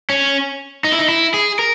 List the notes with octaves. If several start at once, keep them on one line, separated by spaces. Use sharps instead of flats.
C#4
D#4
E4
D#4
E4
G#4
A#4